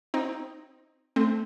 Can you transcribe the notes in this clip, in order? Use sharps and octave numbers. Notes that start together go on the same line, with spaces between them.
C4 D#4
A3 C4